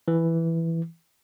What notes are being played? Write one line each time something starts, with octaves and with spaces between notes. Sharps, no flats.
E3